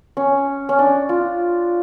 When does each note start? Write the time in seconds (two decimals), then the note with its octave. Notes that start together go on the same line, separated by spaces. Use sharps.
0.17 C#4
0.69 C#4
0.79 D4
1.09 F4